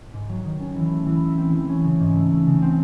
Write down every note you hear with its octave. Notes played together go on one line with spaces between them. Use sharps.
G#2
F#3
D#3
C#4
E3
A3
E3
E4
C4
E3
C#4
C#3
G#2
A3
A3
C#3
C4